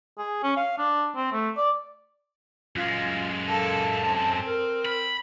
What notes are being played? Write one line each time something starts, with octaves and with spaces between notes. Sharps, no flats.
G#4
C#4
F5
D4
C4
A3
D5
F#2 G#3 F4
A#3 A4 A5
C4
A#4
B5